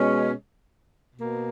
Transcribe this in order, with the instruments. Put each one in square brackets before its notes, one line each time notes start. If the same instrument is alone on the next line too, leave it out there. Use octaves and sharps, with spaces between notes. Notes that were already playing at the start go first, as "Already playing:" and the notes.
Already playing: [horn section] B2 G#3 C#4
B2 A#3